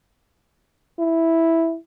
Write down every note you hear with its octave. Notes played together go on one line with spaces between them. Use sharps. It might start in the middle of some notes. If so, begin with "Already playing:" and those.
E4